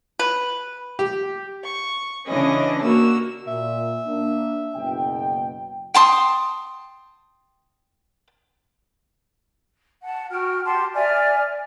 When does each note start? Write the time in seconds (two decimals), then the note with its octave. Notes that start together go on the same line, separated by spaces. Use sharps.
0.19 B4
0.99 G4
1.63 C#6
2.27 C#3 E3 C#4 D4 D#5
2.82 A#3 D4 F#4 E6
3.47 A#2 E5
4.07 A#3 D4
4.76 F#1 B2 G5
5.94 G5 A5 C6 D#6
10.04 F#5 A5
10.30 F#4 G5 F6
10.64 G4 F#5 A5 C6
10.94 D5 E5 G#5 F6